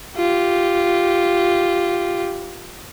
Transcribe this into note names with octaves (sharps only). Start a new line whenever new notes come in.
F4 G4